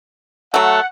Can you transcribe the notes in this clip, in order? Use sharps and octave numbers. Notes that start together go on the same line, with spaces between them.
F#3 A3 F#5